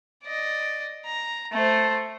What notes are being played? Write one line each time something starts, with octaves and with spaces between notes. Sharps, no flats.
D5 D#5
A#5
A3 C5